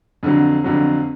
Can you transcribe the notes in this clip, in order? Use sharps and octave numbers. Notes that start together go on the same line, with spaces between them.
F2 D3 F#3
F2 D3 F#3